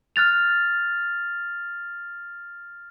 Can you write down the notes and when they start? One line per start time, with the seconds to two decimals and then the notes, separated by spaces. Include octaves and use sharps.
0.16 F6 F#6 A6 F7